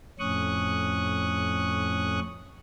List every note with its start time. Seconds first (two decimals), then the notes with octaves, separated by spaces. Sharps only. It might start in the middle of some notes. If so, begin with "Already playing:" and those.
0.19 F2 A2 C#4 C#6 D#6 F#6